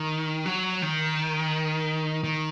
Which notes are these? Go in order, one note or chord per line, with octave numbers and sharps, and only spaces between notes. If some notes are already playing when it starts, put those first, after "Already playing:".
Already playing: D#3
F#3
D#3
D#3